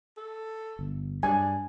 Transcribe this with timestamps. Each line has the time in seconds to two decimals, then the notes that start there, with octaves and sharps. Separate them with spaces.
0.17 A4
0.79 G1
1.23 G2 G3 D4 G#5